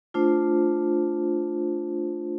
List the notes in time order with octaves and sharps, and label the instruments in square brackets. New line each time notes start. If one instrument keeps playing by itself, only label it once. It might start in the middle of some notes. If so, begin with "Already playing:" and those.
[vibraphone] A3 D4 F4 C5